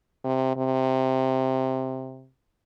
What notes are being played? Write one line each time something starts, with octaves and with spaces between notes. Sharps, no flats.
C3
C3